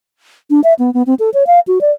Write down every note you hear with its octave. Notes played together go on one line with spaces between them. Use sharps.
D4
E5
B3
B3
C4
A4
C#5
F5
F#4
D5